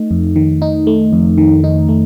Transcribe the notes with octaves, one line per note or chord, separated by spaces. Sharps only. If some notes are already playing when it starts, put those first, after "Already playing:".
Already playing: A3 D#4
F2
D#3
D#4
A3
F2
D#3
D#4
A3